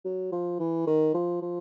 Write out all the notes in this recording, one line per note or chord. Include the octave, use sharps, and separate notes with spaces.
F#3
F3
E3
D#3
F3
F3